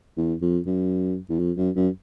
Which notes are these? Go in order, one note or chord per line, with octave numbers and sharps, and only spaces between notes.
E2
F2
F#2
E2
F2
F#2
F#2